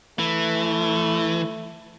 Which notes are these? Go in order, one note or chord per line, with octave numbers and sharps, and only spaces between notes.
E3 A3